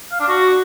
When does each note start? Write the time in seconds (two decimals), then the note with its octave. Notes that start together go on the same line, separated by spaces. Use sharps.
0.12 F5
0.20 D4
0.28 F#4